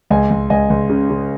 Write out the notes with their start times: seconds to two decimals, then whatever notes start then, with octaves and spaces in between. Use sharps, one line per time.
0.10 C#2 D#5 G#5
0.31 C#2
0.50 C#2 D#5 G#5
0.70 C#2
0.90 C#3
1.10 C#3